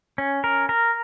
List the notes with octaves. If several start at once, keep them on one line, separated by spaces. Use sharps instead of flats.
C#4
A#4
A#4